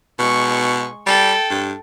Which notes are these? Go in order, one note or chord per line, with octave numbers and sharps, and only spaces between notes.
B2 G#3 C#6
G3 A4 G5
G2